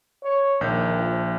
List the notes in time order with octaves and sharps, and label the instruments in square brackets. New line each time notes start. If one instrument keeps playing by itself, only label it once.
[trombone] C#5
[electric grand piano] A#1 G6 [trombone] D#3
[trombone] F3